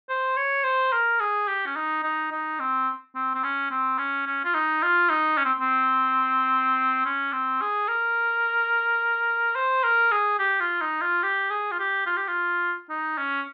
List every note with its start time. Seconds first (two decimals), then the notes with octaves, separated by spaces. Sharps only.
0.09 C5
0.37 C#5
0.64 C5
0.92 A#4
1.20 G#4
1.48 G4
1.66 C#4
1.76 D#4
2.03 D#4
2.32 D#4
2.60 C4
3.15 C4
3.35 C4
3.44 C#4
3.71 C4
3.99 C#4
4.27 C#4
4.44 F4
4.55 D#4
4.83 F4
5.10 D#4
5.38 C#4
5.45 C4
5.60 C4
7.06 C#4
7.33 C4
7.61 G#4
7.88 A#4
9.56 C5
9.84 A#4
10.11 G#4
10.39 G4
10.60 F4
10.81 D#4
11.01 F4
11.23 G4
11.50 G#4
11.71 F4
11.79 G4
12.06 F4
12.17 G4
12.27 F4
12.90 D#4
13.18 C#4